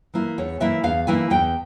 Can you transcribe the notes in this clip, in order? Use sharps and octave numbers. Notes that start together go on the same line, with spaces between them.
E3 A#3 E4
E2 C#5
E3 A#3 E4 E5
E2 F5
E3 A#3 E4 G#5
E2 G5